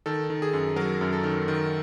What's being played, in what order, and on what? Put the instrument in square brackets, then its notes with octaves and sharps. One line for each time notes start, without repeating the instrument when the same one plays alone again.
[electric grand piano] D#3 A4
D#3
G#4
F#2
F#3 A#4
F#2
A4
D#3
D#3